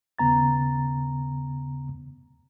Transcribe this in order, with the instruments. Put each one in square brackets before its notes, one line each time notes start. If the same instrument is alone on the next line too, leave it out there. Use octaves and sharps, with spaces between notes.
[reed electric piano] D#2 C#3 B3 A#5 A6